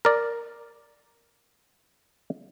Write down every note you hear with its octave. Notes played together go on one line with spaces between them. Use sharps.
A#4 D5